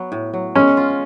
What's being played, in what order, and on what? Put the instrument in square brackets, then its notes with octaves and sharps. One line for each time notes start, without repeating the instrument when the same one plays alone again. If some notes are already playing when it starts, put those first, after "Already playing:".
Already playing: [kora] F#3 B3
A2
F#3
[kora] G#3 [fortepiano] C#4
[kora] F4